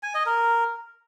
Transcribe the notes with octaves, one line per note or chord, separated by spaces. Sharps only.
G#5
D#5
A#4